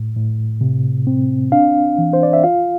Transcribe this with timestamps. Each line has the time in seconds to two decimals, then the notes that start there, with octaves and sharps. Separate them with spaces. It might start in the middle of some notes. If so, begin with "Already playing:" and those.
Already playing: A2
0.16 A2
0.61 C3
1.07 C4
1.52 D4 F5
1.98 E3
2.13 C5
2.23 D5
2.33 E5
2.43 F4 F5